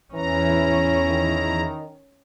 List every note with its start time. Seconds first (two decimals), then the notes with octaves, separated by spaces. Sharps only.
0.14 E2 E3 C#4 E4 A#5
1.10 D#3